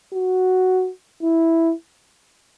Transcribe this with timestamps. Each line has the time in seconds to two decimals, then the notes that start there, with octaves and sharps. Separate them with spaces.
0.13 F#4
1.22 E4